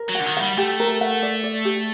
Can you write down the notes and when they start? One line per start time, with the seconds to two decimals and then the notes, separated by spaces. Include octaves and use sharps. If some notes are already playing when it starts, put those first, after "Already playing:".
Already playing: A#4
0.09 F#3
0.15 F#5
0.20 D3
0.26 D#3
0.37 G3 F#5
0.58 A3 G4
0.80 A#4
1.01 F#5
1.22 D5
1.44 D5
1.65 G4